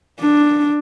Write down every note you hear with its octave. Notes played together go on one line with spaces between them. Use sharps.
D4